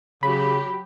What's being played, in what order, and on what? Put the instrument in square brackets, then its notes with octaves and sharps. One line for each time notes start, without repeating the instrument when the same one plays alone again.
[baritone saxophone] C#3 [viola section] F#3 G4 [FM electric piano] B5